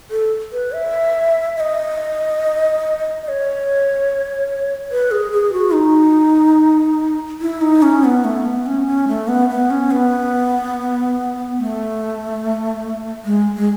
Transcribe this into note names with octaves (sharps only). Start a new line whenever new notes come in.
A4
B4
E5
E5
D#5
D#5
C#5
B4
G#4
G#4
F#4
D#4
E4
D#4
C#4
B3
A3
B3
C#4
C#4
A3
B3
B3
C#4
B3
A3
G#3
G#3